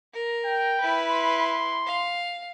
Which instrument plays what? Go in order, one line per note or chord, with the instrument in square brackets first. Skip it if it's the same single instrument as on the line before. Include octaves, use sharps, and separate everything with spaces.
[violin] A#4
[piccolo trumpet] G5
[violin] E4 B4
[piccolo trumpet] C6
[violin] F5